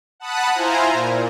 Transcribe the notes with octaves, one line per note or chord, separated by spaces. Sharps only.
F#5 A5 B5 D#6 F#6
E4 F4 C5 G#5 A#5
A#2